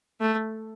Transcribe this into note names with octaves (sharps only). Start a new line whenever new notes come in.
A3